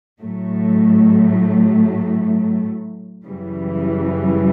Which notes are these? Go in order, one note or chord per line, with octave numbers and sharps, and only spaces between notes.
A2 F#3 A3
F#2 C#3 E3 G3